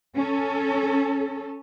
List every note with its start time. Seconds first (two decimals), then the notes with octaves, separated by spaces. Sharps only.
0.16 C#4 A4